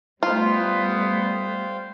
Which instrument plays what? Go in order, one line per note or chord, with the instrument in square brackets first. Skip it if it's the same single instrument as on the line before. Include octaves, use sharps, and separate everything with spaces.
[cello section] G3 A3 [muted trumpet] B3 [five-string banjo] F4 [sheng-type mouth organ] C5 F5 G5